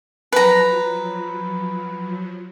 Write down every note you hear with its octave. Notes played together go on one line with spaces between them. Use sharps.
F3 F#3 B4 A#5